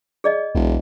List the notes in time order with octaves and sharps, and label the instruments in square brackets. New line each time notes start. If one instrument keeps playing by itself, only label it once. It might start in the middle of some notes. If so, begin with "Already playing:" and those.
[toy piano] G#4 D5 D#5
[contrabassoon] E1 [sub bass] B1